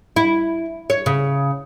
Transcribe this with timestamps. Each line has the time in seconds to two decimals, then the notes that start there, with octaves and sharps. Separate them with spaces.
0.16 E4
0.90 C#5
1.06 C#3